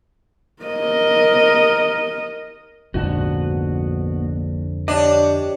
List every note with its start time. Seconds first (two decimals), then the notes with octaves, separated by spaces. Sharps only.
0.63 A#4 D#5
2.94 A#1 F2 G#2 D3 B3 F#4
4.88 D4 G4 C#5 D#5